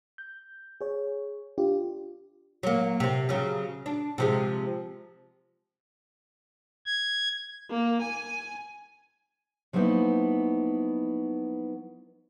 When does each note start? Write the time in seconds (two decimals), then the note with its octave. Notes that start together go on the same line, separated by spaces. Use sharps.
0.18 G6
0.81 G#4 C#5
1.58 D4 F4 G4
2.63 F#3 A#3
3.00 C3 C4
3.29 C#3 F#3
3.86 D4
4.18 C3 F3 G#3
6.86 G#6
7.71 A#3
8.01 G#5
9.73 F3 F#3 A#3 B3 D#4 E4